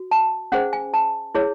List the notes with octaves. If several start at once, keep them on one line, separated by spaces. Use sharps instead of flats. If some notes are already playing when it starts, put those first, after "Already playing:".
Already playing: F#4
A5
C#4 G#4 C5 F#5
G#5
A5
E4 G#4 C#5